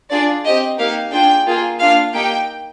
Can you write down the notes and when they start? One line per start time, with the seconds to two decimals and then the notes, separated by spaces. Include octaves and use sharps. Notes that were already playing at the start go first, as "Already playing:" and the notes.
0.10 D4 F4 G#4 D5
0.44 C4 G4 D#5
0.78 A#3 D#4 G4 F5
1.12 D4 F4 G#4 G5
1.46 A#3 F4 G#4
1.79 A#3 D4 F4 F5
2.13 A#3 D#4 G4 G5